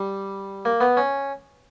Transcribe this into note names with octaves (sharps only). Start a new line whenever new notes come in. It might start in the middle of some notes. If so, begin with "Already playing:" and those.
Already playing: G3
A#3
B3
C#4